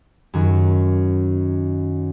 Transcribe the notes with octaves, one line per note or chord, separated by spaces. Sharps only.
F#2 D#3